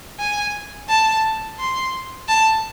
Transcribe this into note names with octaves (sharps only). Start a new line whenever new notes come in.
G#5
A5
C6
A5